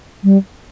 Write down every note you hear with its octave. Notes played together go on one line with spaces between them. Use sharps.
G3